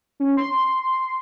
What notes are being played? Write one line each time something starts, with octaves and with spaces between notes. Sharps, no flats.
C#4
C6